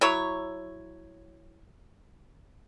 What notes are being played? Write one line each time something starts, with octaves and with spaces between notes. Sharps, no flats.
F#3 E4 C#5